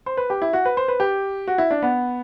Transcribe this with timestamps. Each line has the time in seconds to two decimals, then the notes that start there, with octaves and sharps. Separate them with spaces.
0.06 C5
0.17 B4
0.30 G4
0.42 E4
0.53 F#4
0.65 B4
0.77 C5
0.88 B4
1.00 G4
1.48 F#4
1.58 E4
1.71 D4
1.82 B3